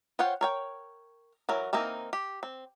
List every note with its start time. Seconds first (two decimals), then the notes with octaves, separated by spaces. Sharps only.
0.19 F4 C5 C#5 F#5 G5
0.41 A#4 C#5 G5
1.49 E3 F#3 A#4
1.73 E3 A#3 C4 D#4 A#4
2.13 G4
2.43 C4